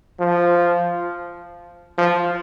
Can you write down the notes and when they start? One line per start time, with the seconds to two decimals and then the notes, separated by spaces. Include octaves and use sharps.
0.20 F3
1.98 F3